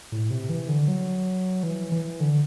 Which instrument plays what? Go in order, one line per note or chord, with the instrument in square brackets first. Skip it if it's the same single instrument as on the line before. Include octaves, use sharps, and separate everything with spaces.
[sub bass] A2
C3
E3
D3
F#3
E3
E3
D3